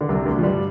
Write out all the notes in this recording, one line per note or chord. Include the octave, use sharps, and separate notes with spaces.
D3
C2 C3
D2 D3
F3
G2 G3